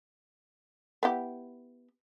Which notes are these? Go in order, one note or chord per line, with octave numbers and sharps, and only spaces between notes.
B3 E4 G4